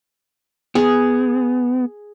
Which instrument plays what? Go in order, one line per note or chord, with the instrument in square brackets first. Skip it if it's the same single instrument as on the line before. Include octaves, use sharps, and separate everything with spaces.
[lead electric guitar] B3 [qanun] G#4